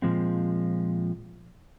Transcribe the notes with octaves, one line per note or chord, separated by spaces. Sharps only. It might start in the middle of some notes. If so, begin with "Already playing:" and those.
A#2 F3 G#3 C4